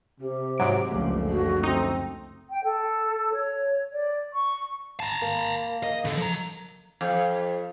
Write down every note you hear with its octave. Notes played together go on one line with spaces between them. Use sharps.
C3 G4
G#2 F#3 D7
F#1 C#2 D3 F3 A3
F#4
C4 D#4
G5
A4
C#5
D5
C#6
A5 A#5
A#3
D#5
C#3 A4
F3 A#5
F2